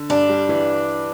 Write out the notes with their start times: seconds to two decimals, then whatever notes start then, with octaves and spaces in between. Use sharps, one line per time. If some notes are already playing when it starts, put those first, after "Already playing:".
Already playing: D3
0.09 G2 D4
0.29 G3
0.49 E3